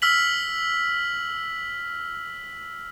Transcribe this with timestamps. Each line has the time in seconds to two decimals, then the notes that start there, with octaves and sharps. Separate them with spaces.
0.02 E6 F6 B6 F#7